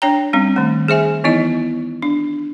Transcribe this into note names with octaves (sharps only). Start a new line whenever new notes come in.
D4 C#5 G5 A#5
G3 C4 C#4
D#3 A3
G#4 C5 E5 G#5
E3 B3 D#4 E4 D#5
D4